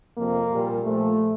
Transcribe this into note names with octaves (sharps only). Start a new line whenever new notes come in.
F2 C3 F3 A#3
A#2 G3
A#2 F3 A3